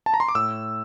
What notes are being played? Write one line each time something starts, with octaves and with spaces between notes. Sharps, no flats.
A5
A#5
C6
D6
A2 E6